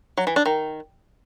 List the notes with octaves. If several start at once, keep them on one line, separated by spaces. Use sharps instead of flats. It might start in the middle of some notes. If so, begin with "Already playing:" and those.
F#3
E3
D4
D#3